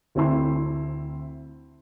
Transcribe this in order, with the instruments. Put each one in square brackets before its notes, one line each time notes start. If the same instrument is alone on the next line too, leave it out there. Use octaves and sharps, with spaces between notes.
[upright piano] D2 C4 E4 C6